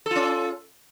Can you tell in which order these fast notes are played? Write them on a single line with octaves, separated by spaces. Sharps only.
A4 F4 C#4